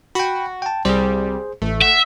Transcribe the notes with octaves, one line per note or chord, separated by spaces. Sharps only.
F#4 G5 B5
G5 A5
C2 G3 C4 G#4 C5
A1 A3
E5 F#5